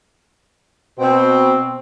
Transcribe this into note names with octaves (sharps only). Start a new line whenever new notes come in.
B2 C4